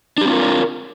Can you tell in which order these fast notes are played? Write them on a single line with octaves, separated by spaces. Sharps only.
D4 G4 C4 F4 A#4